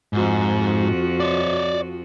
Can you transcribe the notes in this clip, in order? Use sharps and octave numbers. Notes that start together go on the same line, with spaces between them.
F2 G#2 F4 F#4
C#5 D5